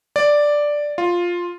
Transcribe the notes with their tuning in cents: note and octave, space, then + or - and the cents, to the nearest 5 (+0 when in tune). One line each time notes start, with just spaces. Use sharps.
D5 +0
F4 +5